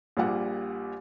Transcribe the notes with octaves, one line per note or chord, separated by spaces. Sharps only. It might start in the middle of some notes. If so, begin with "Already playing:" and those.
A#1 A#2 G3 F#5